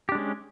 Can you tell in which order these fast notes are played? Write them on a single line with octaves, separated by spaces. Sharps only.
G4 D4 G#3 C#4